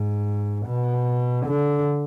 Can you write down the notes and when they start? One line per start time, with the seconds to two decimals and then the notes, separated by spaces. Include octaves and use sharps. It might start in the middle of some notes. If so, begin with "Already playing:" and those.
Already playing: G#2
0.67 B2
1.47 D3